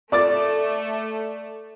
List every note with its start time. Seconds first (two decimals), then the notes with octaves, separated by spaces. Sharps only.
0.12 A3 D5 D6 A6